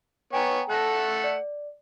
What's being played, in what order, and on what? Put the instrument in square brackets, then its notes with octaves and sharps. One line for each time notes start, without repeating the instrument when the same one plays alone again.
[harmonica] B3 C#5 [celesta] G5 G#5 A#5
[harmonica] A3 A4 F#5 [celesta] F#6 A#6
[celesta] D5